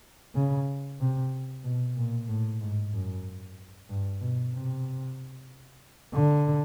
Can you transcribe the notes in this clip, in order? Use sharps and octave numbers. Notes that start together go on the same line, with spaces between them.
C#3
C3
B2
A#2
A2
G#2
F#2
G2
B2
C3
D3